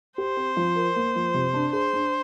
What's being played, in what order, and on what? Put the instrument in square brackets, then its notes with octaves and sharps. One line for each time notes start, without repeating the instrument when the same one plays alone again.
[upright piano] G4 [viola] C5
[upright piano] C4
F3
A#4
A#3
F3
C3
D4
[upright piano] G#4 [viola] C5
[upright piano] D4